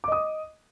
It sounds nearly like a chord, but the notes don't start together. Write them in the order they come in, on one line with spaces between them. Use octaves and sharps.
D6 D#5 D#6